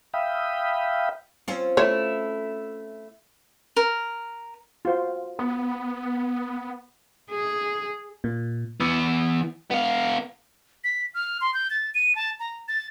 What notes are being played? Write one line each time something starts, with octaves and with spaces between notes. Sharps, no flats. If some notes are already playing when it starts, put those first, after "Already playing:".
E5 F5 G5 B5 D#6
C4 C#4 F4
A3 E4 C#5
A#4
F4 F#4 C5
B3
G#4
A#2
E3 B3
B3 F5
B6
F6
C6
G6
A6
D#7
A5
A#5
A6